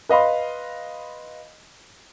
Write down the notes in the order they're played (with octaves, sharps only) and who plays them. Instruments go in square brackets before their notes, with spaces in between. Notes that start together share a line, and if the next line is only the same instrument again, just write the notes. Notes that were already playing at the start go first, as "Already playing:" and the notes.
[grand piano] B4 D#5 F5 B5 C6